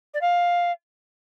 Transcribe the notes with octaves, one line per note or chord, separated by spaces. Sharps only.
D5
F5